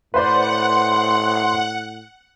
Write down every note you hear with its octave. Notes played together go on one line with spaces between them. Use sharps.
A2 B4 C5 D5 F#5 C6